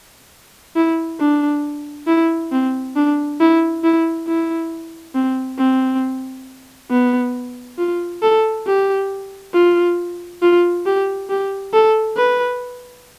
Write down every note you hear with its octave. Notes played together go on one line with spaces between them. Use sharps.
E4
D4
E4
C4
D4
E4
E4
E4
C4
C4
B3
F4
A4
G4
F4
F4
G4
G4
A4
B4